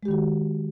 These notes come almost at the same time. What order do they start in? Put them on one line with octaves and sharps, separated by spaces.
G#3 G4 D#3 F#4